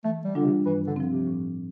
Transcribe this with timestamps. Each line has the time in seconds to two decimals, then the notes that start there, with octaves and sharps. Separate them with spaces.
0.04 E3 A3
0.24 G3
0.35 D3 G3 D4 F4
0.45 C3
0.66 G2 E3
0.87 D3
0.96 F3 C4
1.07 C3
1.27 A2